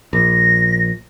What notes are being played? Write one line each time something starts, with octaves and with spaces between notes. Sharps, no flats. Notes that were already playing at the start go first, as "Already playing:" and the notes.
A#1 A#6